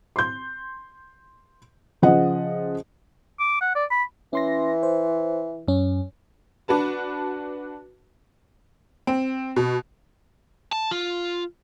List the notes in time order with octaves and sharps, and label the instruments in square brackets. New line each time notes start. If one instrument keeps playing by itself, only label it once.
[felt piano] C6 G6
C#3 F3 G#4 D#5 F#5
[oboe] D6
F#5
D5
B5
[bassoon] E3 [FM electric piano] C#4 C6 A#6
[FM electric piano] C5
F#2 C#4
[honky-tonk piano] D4 F#4 B4 A5
C4
B2
[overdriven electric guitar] A5
F4